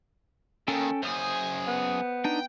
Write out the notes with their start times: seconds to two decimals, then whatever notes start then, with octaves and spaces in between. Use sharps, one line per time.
0.68 D#2 D#3 C#4 A4 G5
1.03 F#2 G#4 C5 D#6
1.67 B3
2.25 D4 D#4 G5